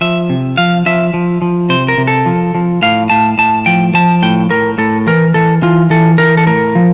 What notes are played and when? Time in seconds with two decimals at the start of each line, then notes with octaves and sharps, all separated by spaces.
0.01 F3 E5
0.30 C3
0.57 F3 F5
0.86 F3 E5
1.14 F3
1.42 F3
1.69 C3 C5
1.88 A#4
1.98 C3
2.07 A4
2.26 F3
2.55 F3
2.82 A2 F5
3.10 A2 A5
3.38 A2 A5
3.66 F3 G5
3.94 F3 A5
4.22 A2 G5
4.50 A2 A#4
4.78 A2 A4
5.07 E3 A#4
5.34 E3 A4
5.62 E3 F4
5.90 E3 A4
6.18 E3 A#4
6.37 A4
6.47 A2 A#4
6.75 F3